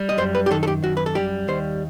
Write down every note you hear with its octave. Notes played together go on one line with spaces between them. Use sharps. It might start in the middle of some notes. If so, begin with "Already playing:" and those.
Already playing: G3
D#5
F#2 C5
B4
G4
D#3 A4
A4
G4
F#2 F#4
B4
A4
G3 G4
D#2 C5